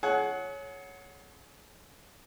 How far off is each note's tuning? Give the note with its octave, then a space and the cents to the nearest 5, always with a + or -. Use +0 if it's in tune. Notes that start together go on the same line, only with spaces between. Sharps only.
G#4 +40 C#5 +0 F#5 +0